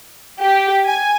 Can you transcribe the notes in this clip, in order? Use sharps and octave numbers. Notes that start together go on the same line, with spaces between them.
G4
G#5